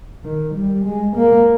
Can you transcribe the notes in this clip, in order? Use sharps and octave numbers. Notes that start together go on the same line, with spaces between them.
D#3
G3
G#3
A#3